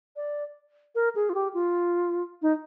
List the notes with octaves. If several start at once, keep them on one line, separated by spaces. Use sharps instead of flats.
D5
A#4
G#4
F4
G4
F4
D#4